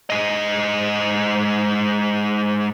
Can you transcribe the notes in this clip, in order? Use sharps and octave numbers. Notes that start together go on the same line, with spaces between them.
G#2 D#5